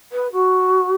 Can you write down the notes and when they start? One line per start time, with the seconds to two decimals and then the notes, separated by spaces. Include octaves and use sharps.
0.12 B4
0.33 F#4